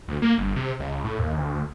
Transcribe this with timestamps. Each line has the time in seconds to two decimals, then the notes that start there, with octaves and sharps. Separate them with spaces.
0.08 D2
0.22 A#3
0.38 G1
0.56 C3
0.80 C#2
1.04 A2
1.19 D#2
1.37 D2